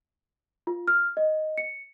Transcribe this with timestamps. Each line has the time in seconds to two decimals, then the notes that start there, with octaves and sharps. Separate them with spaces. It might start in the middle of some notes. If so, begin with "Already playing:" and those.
0.67 F4
0.88 F6
1.17 D#5
1.58 C#7